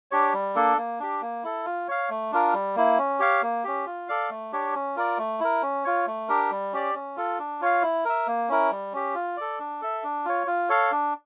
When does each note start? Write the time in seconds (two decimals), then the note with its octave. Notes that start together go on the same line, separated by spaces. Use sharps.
0.11 D4 G4 C#5
0.34 G3
0.55 A#3 D4 A4
0.77 A#3
1.00 D4 G4
1.22 A#3
1.44 E4 A4
1.65 F4
1.88 C#5 F5
2.09 A3
2.32 D4 F4 A#4
2.54 G3
2.76 A#3 E4
2.98 C#4
3.20 G4 C#5 F5
3.42 A#3
3.64 C#4 G4
3.86 F4
4.08 A4 D5 F5
4.30 A3
4.53 D4 G4 C#5
4.74 C#4
4.96 F4 A#4 D5
5.18 A3
5.40 E4 A#4
5.62 C#4
5.84 F4 C#5
6.07 A3
6.28 D4 G4 A#4
6.51 G3
6.73 C#4 G4 D5
6.94 C#4
7.17 F4 A4
7.39 D4
7.61 F4 C#5 F5
7.83 E4
8.05 A#4 E5
8.27 A#3
8.49 C#4 E4 A#4
8.71 G3
8.93 C#4 G4
9.15 F4
9.37 A4 D5
9.59 D4
9.82 A4 E5
10.04 D4
10.25 F4 C#5
10.47 F4
10.69 A4 C#5 F5
10.91 D4